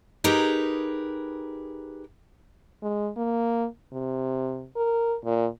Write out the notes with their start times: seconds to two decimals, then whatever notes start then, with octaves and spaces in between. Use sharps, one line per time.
0.24 D#4 G4 G#4 A#4 B4
2.83 G#3
3.17 A#3
3.93 C3
4.76 A#4
5.25 A#2